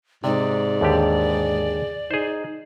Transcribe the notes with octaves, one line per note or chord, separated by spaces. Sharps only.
G#2 C3 D#4 D5
D#2 D3 G4 G#4
D#4 G#4 C5